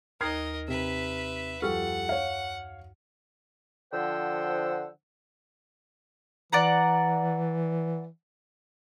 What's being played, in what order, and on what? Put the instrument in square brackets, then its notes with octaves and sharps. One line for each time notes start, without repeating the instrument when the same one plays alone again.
[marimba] D#2 D#4 A#5 [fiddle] A#4 D#5 [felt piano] F6 G#6 C7
[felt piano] C3 [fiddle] B4 E5
[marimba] F#2 C#6 F6 [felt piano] F3 G3 A4 [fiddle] F#5
[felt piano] C#5 F5
[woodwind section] D3 F3 C5 F#5 G5 E6
[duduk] E3 [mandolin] D5 F#5 A#5